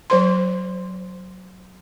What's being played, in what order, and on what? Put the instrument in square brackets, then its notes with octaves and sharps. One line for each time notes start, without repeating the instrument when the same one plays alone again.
[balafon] F#3 C5 C6